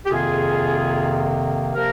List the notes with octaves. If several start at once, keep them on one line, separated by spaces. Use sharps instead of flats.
G4
F2 C3 D#3 A#3 F4 G#4
C3 F3 A#3 G4 A#4